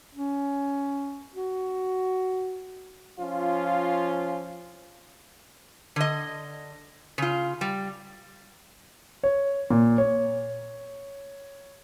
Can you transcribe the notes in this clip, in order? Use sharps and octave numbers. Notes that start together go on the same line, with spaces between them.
C#4
F#4
F3 C#4 F4
D3 D#5
C#3 F4
G3
C#5
A#2
C#5